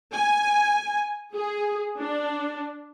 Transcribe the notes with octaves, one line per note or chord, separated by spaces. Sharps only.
G#5
G#4
D4